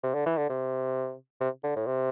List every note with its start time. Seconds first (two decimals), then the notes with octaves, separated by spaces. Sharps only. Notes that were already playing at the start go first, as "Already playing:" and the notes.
0.03 C3
0.14 D3
0.26 E3
0.37 D3
0.50 C3
1.41 C3
1.64 D3
1.76 A2
1.87 C3